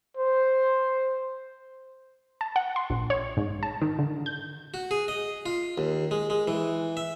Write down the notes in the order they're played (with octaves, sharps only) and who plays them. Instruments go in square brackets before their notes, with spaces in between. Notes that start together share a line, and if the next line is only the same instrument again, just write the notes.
[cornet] C5
[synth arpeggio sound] A5
F#5
C6
A#1
C#5
G#2
A5
D#3
D3
G6
[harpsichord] F#4
G#4
D#5
F4
D#2
G#3
G#3
E3
E5